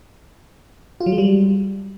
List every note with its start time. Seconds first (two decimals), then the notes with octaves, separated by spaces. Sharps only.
1.00 F4
1.06 F#3
1.12 G#3
1.18 G3